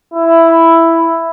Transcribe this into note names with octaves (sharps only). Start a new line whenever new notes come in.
E4